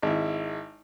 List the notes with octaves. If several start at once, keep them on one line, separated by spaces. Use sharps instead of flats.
G#1 E4